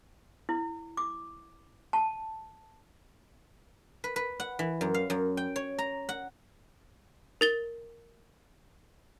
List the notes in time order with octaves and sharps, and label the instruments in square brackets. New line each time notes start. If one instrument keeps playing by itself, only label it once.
[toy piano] E4
D6
A5
[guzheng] B4
B4
F#5
E3
F#2
F5
F#2
G5
C#5
A#5
F#5
[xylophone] A#4 A6 G7